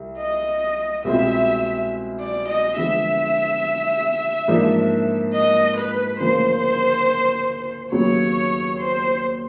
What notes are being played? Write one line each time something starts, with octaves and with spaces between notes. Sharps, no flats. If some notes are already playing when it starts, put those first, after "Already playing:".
Already playing: C2
D#5
C2 B2 G#3 C4 F4 E5
D5
D#5
D3 F3 G#3 B3 E5
G#2 F3 A#3 D4
D#5
B4
D2 C#3 F3 A#3 C5
D#2 C#3 F#3 B3 C#5
C5